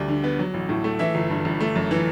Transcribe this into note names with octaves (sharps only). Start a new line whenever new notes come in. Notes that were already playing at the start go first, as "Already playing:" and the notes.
Already playing: D2 G3 D5
D3
B3
F#3
A1
A2
A3
E3 E5
G1
G2
G1
A3
F#2
E3